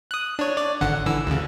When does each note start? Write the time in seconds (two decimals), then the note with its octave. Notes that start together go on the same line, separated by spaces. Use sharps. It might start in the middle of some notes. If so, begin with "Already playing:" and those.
0.11 D#6 F#6
0.39 D4 C#5
0.57 D5
0.81 G#1 D3 F#5
1.06 D3 E3 E6
1.27 D2 C#3